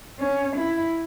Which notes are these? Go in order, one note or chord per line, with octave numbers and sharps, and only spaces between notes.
C#4
E4